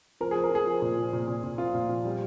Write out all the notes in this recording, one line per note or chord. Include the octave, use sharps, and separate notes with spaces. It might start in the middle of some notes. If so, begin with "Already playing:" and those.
F3 A#4
G#4
F3
A#4
F3 G#4
F3
A#2
F3
A#2
A#2
A#2
F3 F4
A#2
F3
G3